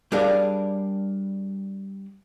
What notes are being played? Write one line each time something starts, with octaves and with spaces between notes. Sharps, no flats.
G3 D4 G#4 A#4 D5 F5